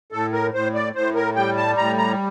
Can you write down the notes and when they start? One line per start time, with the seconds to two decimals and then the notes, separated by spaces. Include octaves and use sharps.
0.12 A2 A4
0.33 A#4
0.54 A2 C5
0.74 D5
0.95 A2 C5
1.15 A#4
1.36 G3 G5
1.57 A5
1.77 A2 A#5
1.98 A#5